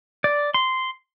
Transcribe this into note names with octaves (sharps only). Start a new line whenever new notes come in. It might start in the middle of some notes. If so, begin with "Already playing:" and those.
D5
C6